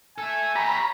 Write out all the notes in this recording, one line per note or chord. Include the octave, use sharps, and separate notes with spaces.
A4 E5 G#5
G4 C#5 A#5 B5